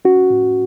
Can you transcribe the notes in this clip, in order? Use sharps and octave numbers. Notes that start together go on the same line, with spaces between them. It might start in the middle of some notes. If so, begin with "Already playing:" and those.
C#4 F#4
A2